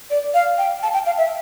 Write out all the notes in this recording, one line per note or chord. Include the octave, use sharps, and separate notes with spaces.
D5
F5
G5
A5
G5
F5
E5